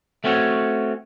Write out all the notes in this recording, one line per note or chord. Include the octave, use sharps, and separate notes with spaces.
A3 C4 C#4 F#4 A4 C#5